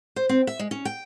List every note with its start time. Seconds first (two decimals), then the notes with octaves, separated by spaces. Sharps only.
0.16 C5
0.29 C4
0.47 E5
0.59 G#3
0.71 C#4
0.85 G5